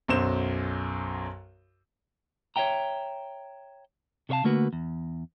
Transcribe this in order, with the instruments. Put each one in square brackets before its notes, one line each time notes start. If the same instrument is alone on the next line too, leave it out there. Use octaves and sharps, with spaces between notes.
[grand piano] B1 F#2 C5 E7
[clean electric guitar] C#5 D#5 E5 G5 A#5
C3 A4 C#5 F5 A5
D3 A3 A#3 F#4 B4
E2